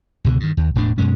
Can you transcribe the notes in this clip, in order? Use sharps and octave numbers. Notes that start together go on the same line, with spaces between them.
C#2 B2 D3
G2 D#3
D#2
E1 A2 G3 D4
F#2 B2 G#3 C#4